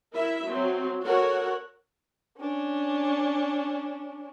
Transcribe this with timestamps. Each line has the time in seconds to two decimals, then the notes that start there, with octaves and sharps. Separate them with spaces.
0.14 E4 A#4 E5
0.46 F#3 C4
1.04 F#4 A4 A#4 C#5 F#5
2.39 C#4 D4